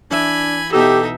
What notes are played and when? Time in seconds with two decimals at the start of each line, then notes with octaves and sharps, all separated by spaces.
0.11 E3 D4 E5 G#5 B5
0.72 B2 D#4 G4 A4 E5 E6